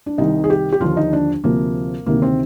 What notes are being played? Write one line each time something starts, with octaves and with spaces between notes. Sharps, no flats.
D4
C2 C3 D#3 D#4
G#4
G4
G4
D#2 D3 F3 F4
D#4
D4
D2 C3 F3 A#3
D2 C3 D#3 A#3
C4